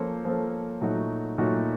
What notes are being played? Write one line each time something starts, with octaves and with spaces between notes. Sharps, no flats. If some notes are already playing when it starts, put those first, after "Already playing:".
Already playing: F3 A#3 C#4 A4 C5
F3 A#3 C#4 A4 C5
A#2 F#3 A3 D#4 F#4
A#2 F#3 A3 D#4 F#4